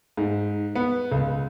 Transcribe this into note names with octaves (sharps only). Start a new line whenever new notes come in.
G#2
B3
C#2